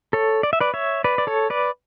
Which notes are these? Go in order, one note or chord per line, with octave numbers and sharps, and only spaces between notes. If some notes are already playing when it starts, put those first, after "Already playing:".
A4 C#5
D5
E5
B4 D5
C#5 E5
B4 D5
D5
A4 C#5
B4 D5